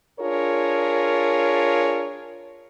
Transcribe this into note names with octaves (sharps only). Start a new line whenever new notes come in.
D4 F4 G#4 A#4 C#5